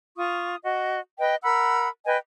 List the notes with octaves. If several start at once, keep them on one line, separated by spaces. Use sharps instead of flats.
F4 C#6 D#6
F#4 D#5
B4 D#5 G5
A#4 F#5 B5 E6
B4 D#5 G5 G#5